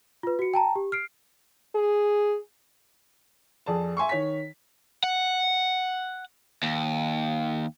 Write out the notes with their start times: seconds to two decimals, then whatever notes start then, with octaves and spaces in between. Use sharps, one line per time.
0.23 F4 B4
0.39 F#4 C#7
0.54 G5 A5 A#5
0.76 G4
0.92 F6 C7 D7
1.75 G#4
3.66 F2 G#4 D5 A5
3.97 E5 G#5 C6 C#6
4.09 D#3 C#5 B6
5.04 F#5
6.63 D#2